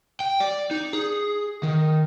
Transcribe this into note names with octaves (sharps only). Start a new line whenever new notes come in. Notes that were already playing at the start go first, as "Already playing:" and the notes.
G5
D5
D#4
G#4
D#3